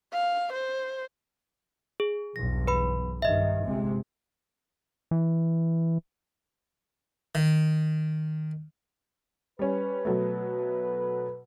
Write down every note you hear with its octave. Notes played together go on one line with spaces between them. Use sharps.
F5
C5
G#4
B1 E2 G2 A#6
B4 B5
G2 D#3 D#5 E5
G1 C3 G#3
E3
D#3
G3 C#4 B4
B2 F#3 A3